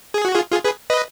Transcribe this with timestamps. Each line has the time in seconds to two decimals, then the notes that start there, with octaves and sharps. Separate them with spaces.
0.14 G#4
0.25 F#4
0.35 F4 G#4
0.52 F4 G#4
0.64 G#4 B4
0.90 B4 D#5